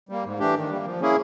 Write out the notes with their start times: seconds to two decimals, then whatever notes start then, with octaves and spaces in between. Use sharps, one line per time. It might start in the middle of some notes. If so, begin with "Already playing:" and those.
0.09 G3 A#3
0.24 G#2
0.39 E3 A3 D4 G4
0.55 D#3
0.70 G3 A#3
0.85 F3
1.00 A#3 C#4 E4 G#4